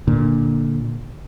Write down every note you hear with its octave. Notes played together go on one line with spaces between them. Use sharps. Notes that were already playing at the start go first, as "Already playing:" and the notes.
A#2 D3